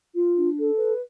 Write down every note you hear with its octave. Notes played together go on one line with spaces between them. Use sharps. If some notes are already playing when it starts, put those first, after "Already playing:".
F4
D4
A4
B4